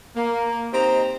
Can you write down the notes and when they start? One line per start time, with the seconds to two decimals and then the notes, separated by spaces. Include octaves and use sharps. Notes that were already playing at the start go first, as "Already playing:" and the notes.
0.16 A#3
0.73 C4 D#4 G4 C5 D#5 A#5